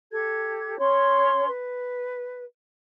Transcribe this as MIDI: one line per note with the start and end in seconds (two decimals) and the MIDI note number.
0.12 0.79 67
0.12 0.79 69
0.12 0.79 92
0.79 1.47 61
0.79 1.47 73
0.79 1.47 84
1.49 2.45 71